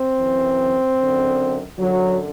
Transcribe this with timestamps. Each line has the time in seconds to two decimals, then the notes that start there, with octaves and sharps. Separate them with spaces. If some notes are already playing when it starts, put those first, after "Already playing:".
Already playing: C4
0.14 F#2 E3
0.96 F#2 D3
1.77 F#2 D3 F#3